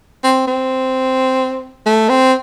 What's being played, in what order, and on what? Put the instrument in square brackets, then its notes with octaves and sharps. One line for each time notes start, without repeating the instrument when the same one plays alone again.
[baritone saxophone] C4
C4
A3
C4